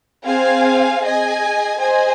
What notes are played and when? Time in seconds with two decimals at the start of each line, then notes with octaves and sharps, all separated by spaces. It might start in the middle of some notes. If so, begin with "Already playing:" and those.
0.24 C4 G#4 F5 G#5
1.01 G#4 D#5 G#5
1.77 G#4 C5 D#5 G#5